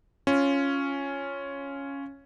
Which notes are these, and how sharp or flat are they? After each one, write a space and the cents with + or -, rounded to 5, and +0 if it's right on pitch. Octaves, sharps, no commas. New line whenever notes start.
C#4 +0 F4 -5